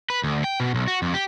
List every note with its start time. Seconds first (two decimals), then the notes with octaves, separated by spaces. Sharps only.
0.10 B4
0.24 D2
0.44 G5
0.60 B2
0.75 B1
0.88 F#4
1.02 F2
1.14 G4